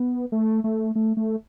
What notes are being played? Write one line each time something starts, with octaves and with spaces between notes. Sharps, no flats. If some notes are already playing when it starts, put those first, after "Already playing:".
Already playing: B3
A3
A3
A3
A3